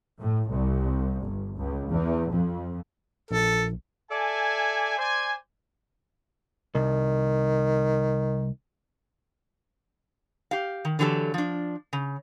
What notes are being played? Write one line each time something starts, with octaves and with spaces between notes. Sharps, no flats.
A2
C2
G1
C#2
E2
F2
A#1 A4
A4 D5 E5 G#5
C5 D5 G#5
C2 D#3
G4 F5
D#3
D3 E3 F#3 G4 A4
F3 D4
C#3